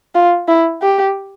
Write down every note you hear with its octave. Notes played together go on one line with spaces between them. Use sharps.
F4
E4
G4